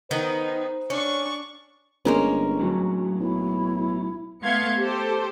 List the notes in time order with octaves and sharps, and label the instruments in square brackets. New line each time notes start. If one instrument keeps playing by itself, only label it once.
[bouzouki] D#3 B3 [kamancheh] D#4 [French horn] C5
[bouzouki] C#4 [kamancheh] D4 C#6
[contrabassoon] G1 [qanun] G#3 A#3 C#4
[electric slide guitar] A2 F#3
[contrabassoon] B1 [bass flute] E4
[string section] A3 B3 F5 C6 G#6 C#7
G4 A4 C5